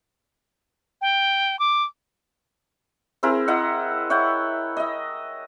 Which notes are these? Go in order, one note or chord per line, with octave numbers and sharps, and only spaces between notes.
G5
D6
C4 E4 G#4 A#4
E4 D#5 F#5
C#5 E5 F#5 G5
D#5 E5